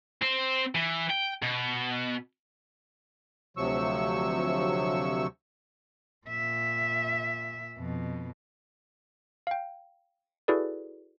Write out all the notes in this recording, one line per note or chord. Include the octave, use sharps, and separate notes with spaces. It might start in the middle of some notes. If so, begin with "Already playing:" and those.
C4 C5
E3
G5
B2
D2 C3 F3 F#3 C#6 E6
A#2 E5
F2 B2
F5 G5
E4 F#4 G#4 A4 B4 D5